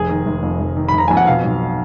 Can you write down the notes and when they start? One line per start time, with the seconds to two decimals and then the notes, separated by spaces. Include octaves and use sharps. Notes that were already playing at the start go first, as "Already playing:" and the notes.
Already playing: F1 G#4
0.09 D#3
0.26 F1
0.43 F2
0.60 F1
0.77 D#3
0.89 B5
0.93 F1 A#5
1.08 F2 G#5
1.17 F#5
1.27 B2 F5
1.44 B1